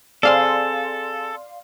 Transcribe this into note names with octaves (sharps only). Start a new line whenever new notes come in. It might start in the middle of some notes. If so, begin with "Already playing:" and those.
C4 G#4 A4 D5 F5 C6